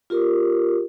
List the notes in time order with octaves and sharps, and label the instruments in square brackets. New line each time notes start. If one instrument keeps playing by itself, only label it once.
[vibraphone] F4 G4 A#4